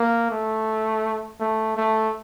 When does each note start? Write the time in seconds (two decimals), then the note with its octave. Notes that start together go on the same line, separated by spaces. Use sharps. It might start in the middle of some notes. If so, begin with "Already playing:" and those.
Already playing: A#3
0.31 A3
1.40 A3
1.77 A3